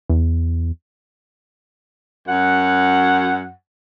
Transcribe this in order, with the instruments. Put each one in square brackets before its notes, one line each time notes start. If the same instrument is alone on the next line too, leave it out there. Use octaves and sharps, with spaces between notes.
[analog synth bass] E2
[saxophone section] F#2 F#5